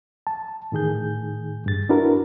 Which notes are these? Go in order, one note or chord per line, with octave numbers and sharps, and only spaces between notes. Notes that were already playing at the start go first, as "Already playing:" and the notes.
A5
A2 D#3 G#4 G6
G2 A6
D4 E4 F#4 A#4 B4